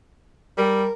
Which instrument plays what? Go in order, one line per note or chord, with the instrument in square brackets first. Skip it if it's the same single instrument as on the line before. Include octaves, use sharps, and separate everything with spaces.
[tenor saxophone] G3 [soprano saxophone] A#4